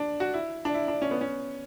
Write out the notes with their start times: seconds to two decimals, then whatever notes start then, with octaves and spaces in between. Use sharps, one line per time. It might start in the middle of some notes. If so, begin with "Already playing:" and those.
Already playing: D4
0.20 F#4
0.34 E4
0.65 D4
0.74 E4
0.88 D4
1.02 C#4
1.11 B3
1.21 C#4